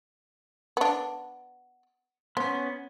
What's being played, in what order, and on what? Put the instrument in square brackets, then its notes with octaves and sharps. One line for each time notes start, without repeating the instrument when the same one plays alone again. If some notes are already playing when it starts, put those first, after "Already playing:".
[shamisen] B3 D4
[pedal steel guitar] B3 C#4 [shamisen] C5